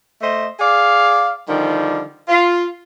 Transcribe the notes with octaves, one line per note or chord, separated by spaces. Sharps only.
A3 C5 D#5
G#4 D5 F5
D3 D#3 F3 G3
F4